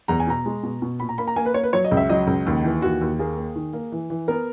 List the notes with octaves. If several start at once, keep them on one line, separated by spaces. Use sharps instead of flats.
E2 A#5
G#5
B2 A#5
G#3
B2
B2
A#2 B5
A#5
A#3 B5
A#5
A#3 G#5
B4
A#3 C#5
B4
F#3 C#5
D#5
C#2
E5
F#3 D#5
C#2
D#2
E3
D#2 F#4
D#2
A#3 G#4
A#3
D#3
A#3
E3
E3
B3 A#4